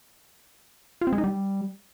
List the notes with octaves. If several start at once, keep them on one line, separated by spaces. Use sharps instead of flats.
F4
C4
G#3
D#4
G3